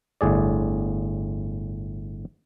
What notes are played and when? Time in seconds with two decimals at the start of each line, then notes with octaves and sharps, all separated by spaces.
0.21 G1 A2 G#4 D5